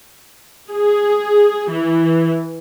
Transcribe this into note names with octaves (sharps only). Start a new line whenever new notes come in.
G#4
E3